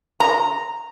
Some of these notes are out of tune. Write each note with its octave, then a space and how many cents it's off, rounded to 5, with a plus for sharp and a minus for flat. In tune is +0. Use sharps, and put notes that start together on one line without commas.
A#5 -5